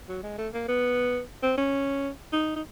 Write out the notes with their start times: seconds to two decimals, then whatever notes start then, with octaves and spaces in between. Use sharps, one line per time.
0.09 F#3
0.23 G#3
0.38 A3
0.54 A#3
0.68 B3
1.43 C4
1.57 C#4
2.33 D#4
2.56 D#4